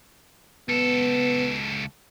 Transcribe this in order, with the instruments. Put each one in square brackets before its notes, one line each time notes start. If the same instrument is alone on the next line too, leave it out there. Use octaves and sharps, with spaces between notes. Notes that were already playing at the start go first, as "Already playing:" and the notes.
[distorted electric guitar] C#2 A4 [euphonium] B3